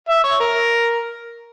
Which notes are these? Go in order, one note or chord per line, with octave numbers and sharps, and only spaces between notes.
E5
C#5
A#4